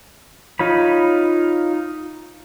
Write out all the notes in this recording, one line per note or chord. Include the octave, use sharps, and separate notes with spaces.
D#4 F4 C#5 B5